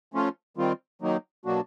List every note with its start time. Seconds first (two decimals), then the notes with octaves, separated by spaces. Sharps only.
0.14 F3 A3 C#4 F4
0.57 D#3 G3 C4 F4
1.02 D#3 F#3 A#3 D#4
1.45 B2 F#3 A#3 D4 F#4